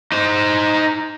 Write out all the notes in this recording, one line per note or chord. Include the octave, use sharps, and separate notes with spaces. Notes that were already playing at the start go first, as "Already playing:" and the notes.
D#4 C5